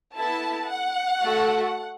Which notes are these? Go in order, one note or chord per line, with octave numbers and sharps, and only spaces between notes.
B3 E4 A4 A5
F#5
A3 F#4 A4